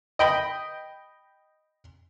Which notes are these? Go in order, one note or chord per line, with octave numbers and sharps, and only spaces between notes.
D#5 G5 B5